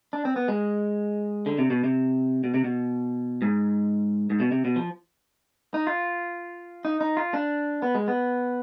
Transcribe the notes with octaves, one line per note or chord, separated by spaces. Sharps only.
D4
C4
B3
G#3
D3
C3
B2
C3
B2
C3
B2
G#2
G#2
B2
C3
B2
F3
D#4
F4
D#4
D#4
F4
D4
B3
G#3
B3